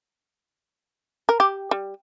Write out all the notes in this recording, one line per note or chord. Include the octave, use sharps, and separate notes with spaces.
A#4
G4
G3